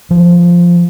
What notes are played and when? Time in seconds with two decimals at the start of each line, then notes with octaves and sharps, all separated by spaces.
0.11 F3